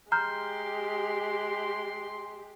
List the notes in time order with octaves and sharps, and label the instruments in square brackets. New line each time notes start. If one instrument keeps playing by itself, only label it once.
[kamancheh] G#3 G4 [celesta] A#5 F6 G6 [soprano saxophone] C6